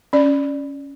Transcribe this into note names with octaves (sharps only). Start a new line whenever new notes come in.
C#4 D5